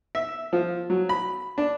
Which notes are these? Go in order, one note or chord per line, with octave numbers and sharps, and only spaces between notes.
E5
F3
F#3
B5
D4